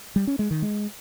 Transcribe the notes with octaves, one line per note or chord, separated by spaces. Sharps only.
G3
C#4
G#3
D#3
G#3